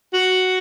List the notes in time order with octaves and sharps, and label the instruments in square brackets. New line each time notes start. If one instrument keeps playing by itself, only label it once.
[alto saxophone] F#4